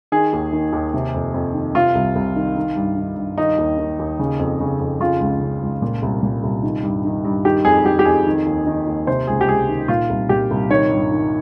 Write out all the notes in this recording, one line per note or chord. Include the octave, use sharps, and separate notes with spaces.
D#3 G#4
D#2
D#3
D#2
C3
F2
F2
D#3
C3 F4
C2
C2
D#3
D#3
G2
D#3
G2
D#3 D#4
D#2
D#3
D#2
C#3
F2
C#3
F2
C#3 F4
C#2
C#3
C#2
A#2
C2
A#2
C2
D#3
G2
D#3
G2
D#3 G4
F2 G#4
D#3 G4
G4
F2 G#4
D#3
D#2
D#3
D#2
C3 C5
C#2 G#4
G4
C#2 G#4
D#3
A#2 F4
C2
A#2 G4
C2
D#3 C#5
G2
D#3